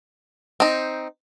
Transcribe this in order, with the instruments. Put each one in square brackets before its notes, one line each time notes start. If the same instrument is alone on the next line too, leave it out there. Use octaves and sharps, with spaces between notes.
[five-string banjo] C4 D#4